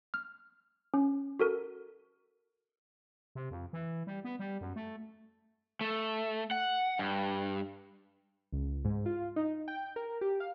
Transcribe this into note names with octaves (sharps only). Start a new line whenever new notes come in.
F6
C#4
F#4 A4 A#4
C3
F2
E3
G3
B3
G3
F#2
A3
A3
F#5
G2
C#2
G#2
F4
D#4
G5
A#4
G4
F5